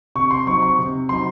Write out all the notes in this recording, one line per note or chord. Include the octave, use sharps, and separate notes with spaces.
C3 C#6
C6
F#3 C4 D#4 C#6
C#6
C3
F#3 C4 D#4 C6